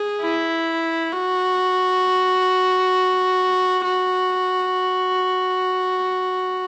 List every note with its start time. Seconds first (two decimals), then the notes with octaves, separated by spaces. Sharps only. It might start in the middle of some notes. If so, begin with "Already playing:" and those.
Already playing: G#4
0.21 E4
1.12 F#4
3.84 F#4